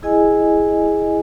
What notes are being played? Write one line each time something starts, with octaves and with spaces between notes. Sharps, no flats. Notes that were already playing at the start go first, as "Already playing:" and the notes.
E4 G#4 D#5 G#5